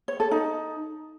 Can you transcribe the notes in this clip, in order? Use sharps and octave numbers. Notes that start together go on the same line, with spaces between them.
C#5
A4
D#4